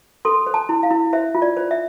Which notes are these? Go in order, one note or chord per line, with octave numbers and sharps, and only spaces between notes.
A4 C6
C5
A5
E4
F5
E4
C5 E5
F4
D5
C5
E5